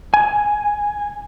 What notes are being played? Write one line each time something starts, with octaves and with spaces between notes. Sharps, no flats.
G#5